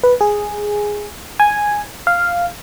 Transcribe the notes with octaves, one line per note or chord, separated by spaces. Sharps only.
B4
G#4
G#5
F5